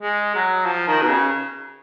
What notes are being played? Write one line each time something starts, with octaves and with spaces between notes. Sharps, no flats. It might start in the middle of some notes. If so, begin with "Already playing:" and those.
G#3
F#3
F3
D#3
B2
C#3